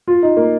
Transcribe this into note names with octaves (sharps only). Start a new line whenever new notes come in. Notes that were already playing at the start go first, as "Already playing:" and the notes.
F4
D#4
A#3